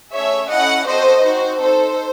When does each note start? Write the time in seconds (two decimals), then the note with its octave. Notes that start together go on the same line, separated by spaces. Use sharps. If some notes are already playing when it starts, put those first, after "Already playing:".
0.13 A3 C#4 G#4 C#5 E5
0.50 C#4 E4 A4 D#5 F#5
0.87 C4 F#4 A4 C5 D#5
1.24 C4 D#4 F#4 C5
1.61 D#4 A4 C5